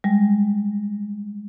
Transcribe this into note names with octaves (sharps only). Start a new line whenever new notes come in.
G3 G#3